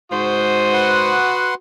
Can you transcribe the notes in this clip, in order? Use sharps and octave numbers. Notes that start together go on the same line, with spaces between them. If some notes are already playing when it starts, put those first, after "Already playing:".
G#2 F#4 C5 D#6
B4 F#5 C6